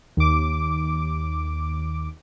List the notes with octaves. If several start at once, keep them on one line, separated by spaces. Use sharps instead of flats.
D#2 D6